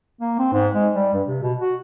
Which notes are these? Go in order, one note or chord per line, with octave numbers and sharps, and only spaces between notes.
A#3
C4
G#2
G#3
G3
G2
C3
B2
F#4